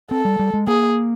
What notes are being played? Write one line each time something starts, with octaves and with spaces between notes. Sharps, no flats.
C4 A4
G3
G3
G#3
A#3 G#4